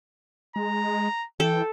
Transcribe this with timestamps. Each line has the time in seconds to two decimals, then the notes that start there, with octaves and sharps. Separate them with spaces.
0.56 G#3 A#5
1.40 E3 A4 G5